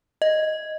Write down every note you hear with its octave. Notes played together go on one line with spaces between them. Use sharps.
D#5